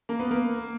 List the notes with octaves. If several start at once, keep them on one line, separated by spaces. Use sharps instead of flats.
A#3
B3
A#3